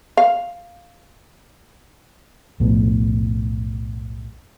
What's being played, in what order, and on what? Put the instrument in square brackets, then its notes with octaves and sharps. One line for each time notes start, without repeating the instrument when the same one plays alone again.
[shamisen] F5
[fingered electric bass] B1 F2 A2